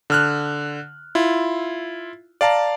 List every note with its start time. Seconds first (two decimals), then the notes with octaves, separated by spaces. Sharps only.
0.10 D3 F6 F#6
1.15 E4 F4
2.41 D5 F5 A5 A#5